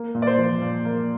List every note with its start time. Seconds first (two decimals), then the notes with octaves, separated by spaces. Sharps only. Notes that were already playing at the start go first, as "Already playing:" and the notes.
Already playing: A#3
0.15 A#2
0.22 D5
0.27 C5
0.38 F3
0.61 A#2
0.85 A#3